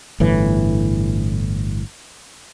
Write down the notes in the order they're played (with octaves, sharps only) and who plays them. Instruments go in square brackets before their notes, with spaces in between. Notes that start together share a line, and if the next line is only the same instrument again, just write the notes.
[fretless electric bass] G1 A2 E3